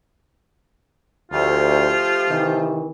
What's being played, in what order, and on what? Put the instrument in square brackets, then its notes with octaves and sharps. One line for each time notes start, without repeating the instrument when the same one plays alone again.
[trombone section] D2 [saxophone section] F3 A3 G4 [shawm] F4
[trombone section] C3 D#3 E3